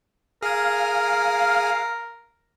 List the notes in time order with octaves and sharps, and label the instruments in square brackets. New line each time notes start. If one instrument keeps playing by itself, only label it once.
[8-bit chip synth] G#4 G#5 [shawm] A#4 [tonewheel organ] F5